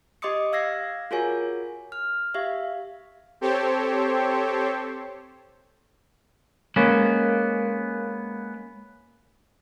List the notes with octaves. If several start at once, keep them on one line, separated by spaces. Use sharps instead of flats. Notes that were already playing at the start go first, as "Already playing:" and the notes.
G4 D#5 C6 D6 D#6 C#7
F5 E6 G#6 A#6 C7
F4 F#4 G#4 A#4 C#5 G#5
F6
G4 E5 F5
C4 G4 A4 C5 C#5
G#3 A#3 B3 C#4